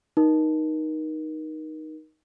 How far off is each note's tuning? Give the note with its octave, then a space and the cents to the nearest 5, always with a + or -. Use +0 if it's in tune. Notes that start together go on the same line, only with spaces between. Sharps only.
D#4 +0 A#4 +30